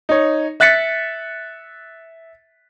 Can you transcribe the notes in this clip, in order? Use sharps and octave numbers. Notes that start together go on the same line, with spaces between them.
D#4 C#5
E5 F#6 A6 B6 C#7